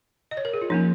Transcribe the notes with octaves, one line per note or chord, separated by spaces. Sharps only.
D#5
C#5
A#4
G#4
F4
F3 A#3 C#4 D#4